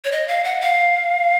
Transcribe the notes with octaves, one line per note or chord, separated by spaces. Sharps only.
C#5
D#5
F5
F#5
F5